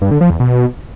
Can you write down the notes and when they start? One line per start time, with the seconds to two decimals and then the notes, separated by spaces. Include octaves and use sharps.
0.02 G2
0.11 D3
0.21 F3
0.30 E2
0.40 B2